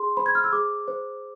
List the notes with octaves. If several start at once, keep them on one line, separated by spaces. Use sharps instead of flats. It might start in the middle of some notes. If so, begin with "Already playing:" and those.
Already playing: G#4 C6
C5 B5
G#6
F6
E6
G#4 D6
C5